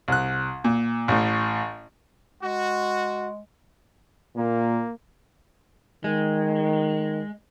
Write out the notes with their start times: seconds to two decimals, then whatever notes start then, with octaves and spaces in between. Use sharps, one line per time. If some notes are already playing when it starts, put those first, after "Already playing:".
0.08 C2 F#6
0.64 A#2
1.08 A1 A2
2.42 G#3 F#4
4.37 A#2 A#3
6.04 D#3 G#3